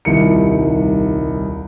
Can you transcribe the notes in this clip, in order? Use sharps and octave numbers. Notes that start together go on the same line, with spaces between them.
D#1 C2 D#3 C#7